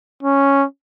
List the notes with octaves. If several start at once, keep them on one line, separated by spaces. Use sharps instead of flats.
C#4